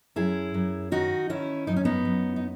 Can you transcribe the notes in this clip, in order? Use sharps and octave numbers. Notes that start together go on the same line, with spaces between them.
F#2 E4 G#4
F#2
D#3 D#4 F#4
D#3 C#4 E4
F#2 D#4
C#4
B3 D#4
F#2
D#4